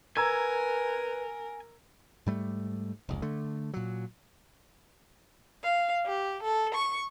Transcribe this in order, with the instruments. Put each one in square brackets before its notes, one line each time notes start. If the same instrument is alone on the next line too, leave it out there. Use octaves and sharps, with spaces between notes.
[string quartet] A#4 [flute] B4 [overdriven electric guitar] G#5 [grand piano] A#5 E6 G#6
[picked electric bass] G#2 G3 A3
F1 C#2
D3 A3
A#2 F#3
[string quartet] F5
G4
A4
C#6